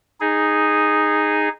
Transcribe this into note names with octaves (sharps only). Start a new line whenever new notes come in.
D#4 G#4